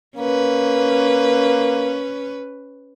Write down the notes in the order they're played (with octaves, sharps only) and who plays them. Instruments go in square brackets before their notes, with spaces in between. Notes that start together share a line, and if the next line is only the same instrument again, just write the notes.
[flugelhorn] A#3 [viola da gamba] C#4 B4